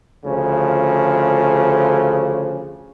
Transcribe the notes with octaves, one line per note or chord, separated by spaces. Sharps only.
D2 C#3 F3